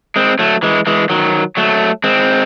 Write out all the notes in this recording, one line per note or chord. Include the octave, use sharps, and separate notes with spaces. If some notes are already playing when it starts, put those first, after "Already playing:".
G#3 C4
F#3 A3
E3 G#3
E3 G#3
D#3 F#3
F#3 A3
G#3 C4